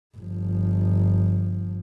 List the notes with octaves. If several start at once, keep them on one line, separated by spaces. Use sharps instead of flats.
G1 F3